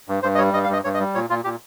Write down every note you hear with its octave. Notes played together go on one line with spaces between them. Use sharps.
G2
G2 C5
D#5
G3 C#5
G2 D#5
F5
G2 D#5
G2 C#5
D#5
G3
A#2 C#5
A#2 F4
A#2 G4